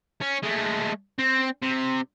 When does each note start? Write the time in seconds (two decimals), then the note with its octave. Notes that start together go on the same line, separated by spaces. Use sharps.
0.22 C#4
0.43 G#3 A3
1.19 C4
1.63 C3